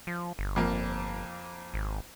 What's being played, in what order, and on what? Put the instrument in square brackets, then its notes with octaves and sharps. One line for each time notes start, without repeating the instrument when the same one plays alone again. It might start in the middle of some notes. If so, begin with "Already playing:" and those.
[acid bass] F3
G1
[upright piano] F2 A#3
[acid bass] G#1